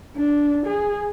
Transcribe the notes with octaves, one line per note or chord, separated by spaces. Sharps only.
D4
G#4